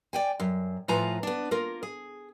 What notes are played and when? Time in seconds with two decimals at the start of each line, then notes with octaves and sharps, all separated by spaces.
0.13 D5 G5 G#5
0.40 F#2
0.88 A2 F3 F4 B4 G#5 A#5
1.23 B3 D4
1.51 A#3 F4 A#4
1.83 G#4